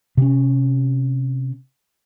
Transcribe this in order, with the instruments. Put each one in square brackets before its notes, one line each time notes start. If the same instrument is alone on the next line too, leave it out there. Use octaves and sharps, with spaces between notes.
[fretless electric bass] C3 C#4